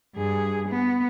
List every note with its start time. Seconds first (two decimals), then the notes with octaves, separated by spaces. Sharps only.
0.15 G2 G#4
0.69 B3